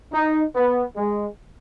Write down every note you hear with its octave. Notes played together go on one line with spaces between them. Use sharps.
D#4
B3
G#3